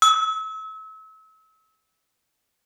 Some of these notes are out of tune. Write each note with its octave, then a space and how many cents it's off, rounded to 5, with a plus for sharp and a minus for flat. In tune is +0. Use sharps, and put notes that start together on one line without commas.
E6 -35